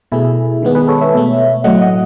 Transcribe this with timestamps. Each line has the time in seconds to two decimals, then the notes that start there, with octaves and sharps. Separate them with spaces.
0.12 B2 A3 E4 G#4
0.63 D#3 G#3 B3
0.75 G#4 B4
0.88 A4 C#5
1.01 C#5 E5
1.14 B2 A3
1.64 A2 F#3 A3 D#5 F#5
1.82 D#5 F#5